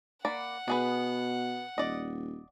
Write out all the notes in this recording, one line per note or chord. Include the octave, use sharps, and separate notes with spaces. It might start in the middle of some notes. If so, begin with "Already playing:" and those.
A#3 D5 F#5 B5
B2 B3 G#4 B4
D#1 D5 D#5